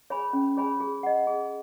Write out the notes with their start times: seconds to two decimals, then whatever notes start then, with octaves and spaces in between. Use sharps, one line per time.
0.10 G#4 C#5 G#5 B5
0.33 C#4
0.57 G#4 C#5 G#5 B5
0.80 G#4
1.03 D#5 F#5
1.27 G#4